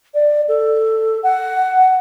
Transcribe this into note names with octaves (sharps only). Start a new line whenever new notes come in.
D5
A4
F#5